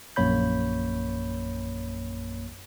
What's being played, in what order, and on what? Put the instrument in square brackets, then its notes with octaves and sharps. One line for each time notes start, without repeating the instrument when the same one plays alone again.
[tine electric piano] A#1 F#2 A#3 C#5 B5 G6